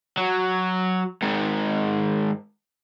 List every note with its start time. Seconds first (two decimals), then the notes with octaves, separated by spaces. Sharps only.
0.18 F#3
1.22 G#2 D#3